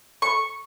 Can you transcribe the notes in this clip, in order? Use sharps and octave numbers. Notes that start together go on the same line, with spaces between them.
C#6